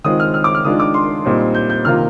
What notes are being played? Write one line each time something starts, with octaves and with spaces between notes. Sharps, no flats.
D#3 G#3 C4 F4 D#6
F6
F6
D6
F6
D#3 G#3 D4 F4 D#6
D6
C6
A#2 G3 C4 D#4
G6
G6
C3 D#3 A#3 F4 F6